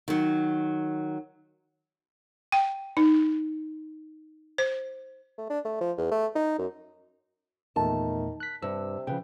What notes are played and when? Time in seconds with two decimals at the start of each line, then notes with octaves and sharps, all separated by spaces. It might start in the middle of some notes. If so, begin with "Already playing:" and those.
0.08 D#3 F#3
2.52 G5
2.97 D#4
4.58 C5
5.38 A3
5.50 D4
5.65 A3
5.81 F3
5.98 E2
6.11 A3
6.35 D#4
6.59 F#2
7.76 E2 A#2 D#3 A3 A5
8.40 F#6 B6
8.62 G2 C3 E6
9.07 C#3 F3 B4 G5